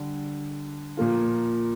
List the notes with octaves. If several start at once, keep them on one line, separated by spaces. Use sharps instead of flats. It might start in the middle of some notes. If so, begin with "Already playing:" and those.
Already playing: D3 G3
A#2 F3 A#3 F4